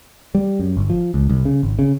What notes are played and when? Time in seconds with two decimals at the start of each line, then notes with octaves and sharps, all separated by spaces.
0.35 G3
0.59 F#2
0.77 G1
0.90 F3
1.14 C#2
1.29 C2
1.45 C#3
1.63 G#1
1.79 C#3